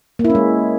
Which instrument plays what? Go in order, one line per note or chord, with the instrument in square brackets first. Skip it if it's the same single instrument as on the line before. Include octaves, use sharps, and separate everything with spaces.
[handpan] A#3
E4
C#4
G#3